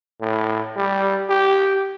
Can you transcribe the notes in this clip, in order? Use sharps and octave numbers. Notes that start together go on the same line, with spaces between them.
A2
G3
G4